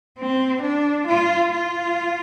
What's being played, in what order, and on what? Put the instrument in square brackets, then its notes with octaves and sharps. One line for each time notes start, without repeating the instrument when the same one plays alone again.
[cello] C4
D4
F4
F4